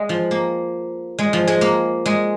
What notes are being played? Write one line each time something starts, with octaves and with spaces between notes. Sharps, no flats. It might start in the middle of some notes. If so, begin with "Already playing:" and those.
Already playing: G#3
F3
A#3
G#3
F3
G#3
A#3
G#3